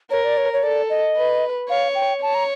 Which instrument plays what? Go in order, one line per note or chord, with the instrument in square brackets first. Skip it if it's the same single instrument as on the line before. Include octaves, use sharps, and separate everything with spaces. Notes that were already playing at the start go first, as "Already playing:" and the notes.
[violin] A#4 [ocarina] C#5
[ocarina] D5
C#5
C#5
[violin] A4 [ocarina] D5
[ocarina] D#5
[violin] B4
[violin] C#5 [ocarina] F5
[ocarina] G5
[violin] C#5 [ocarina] A5
[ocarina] A#5